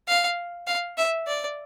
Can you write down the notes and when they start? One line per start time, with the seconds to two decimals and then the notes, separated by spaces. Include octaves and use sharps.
0.08 F5
0.67 F5
0.97 E5
1.27 D5